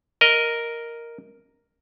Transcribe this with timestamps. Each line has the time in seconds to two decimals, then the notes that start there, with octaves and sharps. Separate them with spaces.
0.21 A#4 D#5